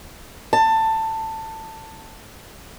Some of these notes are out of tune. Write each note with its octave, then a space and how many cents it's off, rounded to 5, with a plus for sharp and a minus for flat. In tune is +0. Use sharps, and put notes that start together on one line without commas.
A5 +15